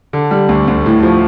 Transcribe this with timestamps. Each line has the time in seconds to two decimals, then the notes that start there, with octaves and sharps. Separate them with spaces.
0.13 D3
0.31 G3
0.49 D2
0.68 D2
0.86 A2
1.03 F3